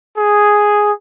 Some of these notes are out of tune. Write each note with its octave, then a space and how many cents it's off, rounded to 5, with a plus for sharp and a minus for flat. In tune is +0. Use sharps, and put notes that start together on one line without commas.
G#4 +0